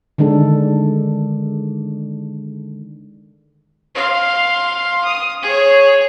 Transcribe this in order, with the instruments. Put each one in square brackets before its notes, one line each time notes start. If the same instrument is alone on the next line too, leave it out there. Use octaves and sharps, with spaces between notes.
[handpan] D3 D#3 G#3 D4 A4
[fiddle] F5 C6
D#6
G#4 C#5